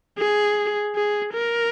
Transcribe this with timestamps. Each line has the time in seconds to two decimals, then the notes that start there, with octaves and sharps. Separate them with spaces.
0.18 G#4
0.95 G#4
1.34 A#4